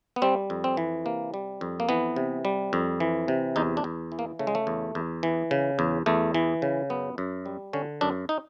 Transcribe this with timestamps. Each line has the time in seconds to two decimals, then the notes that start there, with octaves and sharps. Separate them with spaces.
0.16 B3
0.22 G3 C4
0.50 F2
0.64 C4
0.77 E3
1.05 C3 A#3
1.34 G3
1.61 F2
1.80 A#3
1.89 E3 B3
2.16 C3
2.45 G3
2.73 F2
3.00 E3
3.28 C3
3.56 E2 D#4
3.77 D4
3.84 E2
4.12 E3
4.19 A#3
4.39 C#3 A3
4.47 G#3
4.55 A3
4.67 E2
4.95 E2
5.23 E3
5.51 C#3
5.79 E2
6.06 E2 A3
6.34 E3
6.62 C#3
6.90 F#2 B3
7.18 F#2
7.46 G3
7.73 D3 C#4
8.01 F#2 D4
8.29 D#4